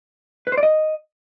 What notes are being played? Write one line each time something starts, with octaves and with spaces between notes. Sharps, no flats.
B4
C5
D5
D#5